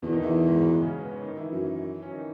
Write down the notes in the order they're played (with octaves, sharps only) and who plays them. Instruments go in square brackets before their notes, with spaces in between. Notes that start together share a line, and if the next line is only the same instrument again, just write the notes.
[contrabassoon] E2 [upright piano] B2 B3
[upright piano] D#3 D#4
[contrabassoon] E2 [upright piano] E3 E4
[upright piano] G#2 G#3
F#3
G#2 G#3
C#3 C#4
B3
C#4
D#3 D#4
E3 E4
[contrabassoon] F#2
[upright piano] C#4
D#3 D#4